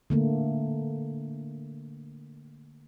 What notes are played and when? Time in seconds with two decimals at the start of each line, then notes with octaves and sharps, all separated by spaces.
0.10 D3 A3 A#3